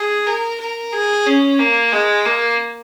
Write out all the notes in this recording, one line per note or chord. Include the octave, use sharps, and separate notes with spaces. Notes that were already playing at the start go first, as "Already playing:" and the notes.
Already playing: G#4
A#4
A#4
G#4
C#4
A#3
G#3
A#3